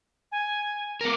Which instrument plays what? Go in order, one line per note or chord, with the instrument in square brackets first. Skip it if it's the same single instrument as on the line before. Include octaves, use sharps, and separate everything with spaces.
[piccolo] G#5
[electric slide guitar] B3 A#4